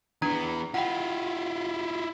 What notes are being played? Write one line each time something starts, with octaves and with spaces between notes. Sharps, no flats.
E3 B3 D4 A#5
E4 F4 F#5 G5